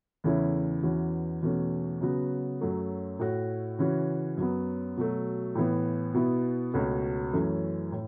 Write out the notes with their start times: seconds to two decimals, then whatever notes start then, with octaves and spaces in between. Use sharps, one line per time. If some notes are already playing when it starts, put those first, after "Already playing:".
0.24 E2 C#3 A3 C#4 E4
0.83 E2 E3 C#4 F#4
1.42 E2 B2 A3 C#4
2.01 C#3 F#3 B3 F#4
2.61 F#2 F#3 A3
3.19 A2 A3 F#4
3.79 C#3 E3 C#4 F#4
4.37 F#2 F#3 B3
4.97 B2 F#3 A3
5.55 A2 E3 B3
6.14 B2 B3 E4
6.74 C#2 B2 A3 C#4 F#4
7.33 F#2 E3 A3 C#4
7.92 A2